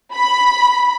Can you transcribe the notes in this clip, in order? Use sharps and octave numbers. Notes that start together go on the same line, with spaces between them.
B5